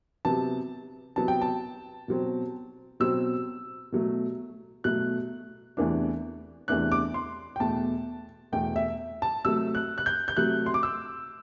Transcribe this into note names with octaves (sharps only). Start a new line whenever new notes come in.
C3 F#3 B3 A5
C3 F#3 B3 A5
G5
A5
B2 F#3 C4
B2 F#3 C4 E6
B2 F#3 A3
B2 F#3 A3 F#6
E2 C3 E3 A3 D4
E2 C3 E3 A3 D4 F#6
D6
C6
G5
E2 B2 A3 A5
E2 B2 A3 G5
E5
A5
C3 F#3 A3 E6
F#6
F#6
G6
G6
C3 F#3 A3 F#6
C6
D6
E6